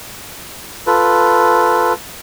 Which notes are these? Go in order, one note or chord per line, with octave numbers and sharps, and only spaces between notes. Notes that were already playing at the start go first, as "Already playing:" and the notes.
F4 A4 B4